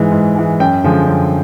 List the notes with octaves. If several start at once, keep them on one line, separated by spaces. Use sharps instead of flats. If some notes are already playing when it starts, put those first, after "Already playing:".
Already playing: G#2 E3 G#3
G#2
E3 G#3
F#2 G5
D3 F3 G#3
F#2